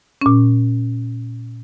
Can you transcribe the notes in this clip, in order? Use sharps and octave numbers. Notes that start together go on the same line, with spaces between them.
A#2 C#4